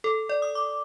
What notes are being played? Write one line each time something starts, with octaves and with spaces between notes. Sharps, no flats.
A4
D5
D#6
D6